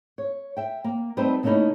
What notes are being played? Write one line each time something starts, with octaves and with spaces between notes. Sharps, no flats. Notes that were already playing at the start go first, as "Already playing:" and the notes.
C#5
E5 G5
A#3
G3 A3 C4 D#4 B4 C5
C#3 A3 A#3 C#4 D#4 E4